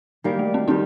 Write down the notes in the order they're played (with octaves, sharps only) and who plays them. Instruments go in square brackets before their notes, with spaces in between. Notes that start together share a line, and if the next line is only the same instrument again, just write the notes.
[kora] D#3 G3 A#3
[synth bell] A3
C4
[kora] D#3 G3 [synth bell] C4 D#4